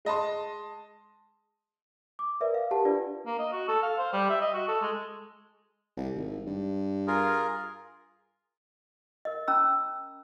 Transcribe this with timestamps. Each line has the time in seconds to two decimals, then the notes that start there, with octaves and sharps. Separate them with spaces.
0.05 G#3 D#5 A5 C6
2.19 D6
2.41 A#4 B4 D5 E5
2.54 F5
2.71 G4 A#4 F#5 A5
2.85 D4 F4 B4 D5
3.26 A#3
3.39 D#5
3.52 F#4
3.68 A4
3.82 F5
3.98 C5
4.13 G3
4.30 E5
4.41 D#5
4.54 F#4
4.68 A4
4.82 G#3
5.97 C2
6.15 G#1
6.47 G2
7.08 F4 G#4 A#4
9.25 A#4 D#5
9.48 C#4 A#5 B5 E6